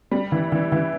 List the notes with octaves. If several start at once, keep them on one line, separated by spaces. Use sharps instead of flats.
G3
E3
E3
E3